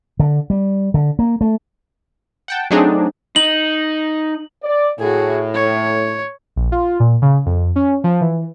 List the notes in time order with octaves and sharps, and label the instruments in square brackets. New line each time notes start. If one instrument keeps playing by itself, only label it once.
[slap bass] D3
G3
D3
A#3
A3
[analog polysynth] F#5 G5 A5
F#3 A3 C4 D4 D#4 G#4
[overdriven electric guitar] D#4 [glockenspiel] F#7
[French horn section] D5
[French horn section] A2 [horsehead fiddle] F#4 G#4
[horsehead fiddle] C#5
[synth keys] A#1
F4
A#2
C#3
F2
C#4
F3
E3